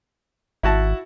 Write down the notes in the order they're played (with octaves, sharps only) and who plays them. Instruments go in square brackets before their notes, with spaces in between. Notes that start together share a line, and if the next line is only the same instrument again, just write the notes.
[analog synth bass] G#1 [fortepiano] E4 F#4 A5